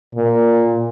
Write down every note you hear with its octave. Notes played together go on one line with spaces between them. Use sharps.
A#2